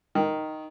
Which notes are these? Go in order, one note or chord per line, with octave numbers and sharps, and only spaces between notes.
D#3